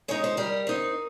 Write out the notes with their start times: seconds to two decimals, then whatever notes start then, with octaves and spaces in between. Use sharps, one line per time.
0.08 G#3 D#4 C#5
0.24 C5
0.37 G3 A#4
0.67 C4 D#4